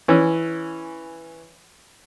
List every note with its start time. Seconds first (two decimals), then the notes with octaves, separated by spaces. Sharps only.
0.08 E3 C#4